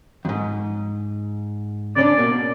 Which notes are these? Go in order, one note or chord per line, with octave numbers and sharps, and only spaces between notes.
F2 G#2
C#3 C#4 D4 D5
B2 A#3